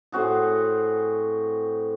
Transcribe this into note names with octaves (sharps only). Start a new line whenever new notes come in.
A2 C4 F#4 G#4